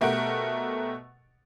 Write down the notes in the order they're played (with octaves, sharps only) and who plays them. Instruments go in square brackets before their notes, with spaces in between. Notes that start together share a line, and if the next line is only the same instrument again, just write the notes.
[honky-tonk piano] B2 A3 G4 A#4 F#5 D7